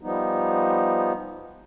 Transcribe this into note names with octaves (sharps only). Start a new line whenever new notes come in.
F3 G3 B3 D#4